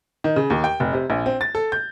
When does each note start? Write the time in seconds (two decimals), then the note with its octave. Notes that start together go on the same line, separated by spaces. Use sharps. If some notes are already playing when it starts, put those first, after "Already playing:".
0.24 D#3
0.36 C#3
0.50 D#2
0.64 G5
0.80 F1
0.93 C3
1.10 A#1
1.26 C4
1.41 A6
1.55 A4
1.72 G6